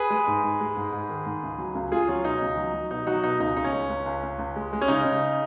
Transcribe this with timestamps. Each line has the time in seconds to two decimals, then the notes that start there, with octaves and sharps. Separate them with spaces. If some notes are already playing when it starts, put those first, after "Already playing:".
Already playing: G#4 B4
0.10 G#3
0.27 G#2
0.44 G#2
0.61 G#3
0.77 G#2
0.92 G#2
1.09 D#3
1.26 G#2
1.43 C#2
1.58 F#3
1.75 C#2
1.92 C#2 F4 G#4
2.08 F#3 C#4 F4
2.24 B2 D#4
2.42 C#2
2.58 F#3
2.74 F#3
2.91 B2 D#4
3.07 F#3 D#4 F#4
3.23 B2 D#4
3.40 C#2 D#4
3.57 C#2 D#4
3.64 C#4
3.73 G#3
3.90 C#2
4.06 C#2
4.23 C#2
4.39 C#2
4.56 G#3
4.73 G#3
4.82 C#4
4.88 C#3 D#4
5.05 C#3